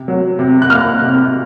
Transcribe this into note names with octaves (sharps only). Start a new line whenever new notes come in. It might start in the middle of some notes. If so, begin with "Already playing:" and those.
Already playing: C3
F#3
C3
F#6
A#3 F6
C3